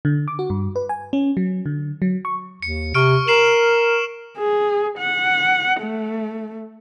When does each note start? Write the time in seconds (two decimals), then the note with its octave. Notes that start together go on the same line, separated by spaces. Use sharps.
0.05 D3
0.28 D6
0.39 F#4
0.50 G2
0.76 B4
0.89 G#5
1.13 C#4
1.37 F#3
1.66 D3
2.02 F#3
2.25 C#6
2.62 D#2 C#7
2.94 C3 C#6 F6 D7
3.27 A#4 C7 E7 F#7
4.38 G#4
4.98 F#5
5.81 A3